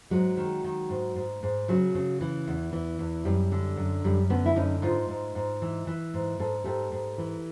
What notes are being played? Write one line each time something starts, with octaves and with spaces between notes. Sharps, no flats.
G#2 F#3 G#3
D#3
D#3
G#2
G#2
G#2
C#3 F#3
C#3
E3
E2
E3
E2
F#2 G3
D3
F#2
F#2 G3
D3 B3 C#4
E4
F#2 C#4 D#4
G#2 D#4 F4
G#2
G#2
E3
E3
G#2
G#2 A4
G#2 G4 A4
G#2
E3